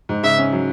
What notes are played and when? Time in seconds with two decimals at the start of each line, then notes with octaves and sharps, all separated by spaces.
0.09 G#2
0.23 C#3 E5
0.38 C#4
0.52 F#3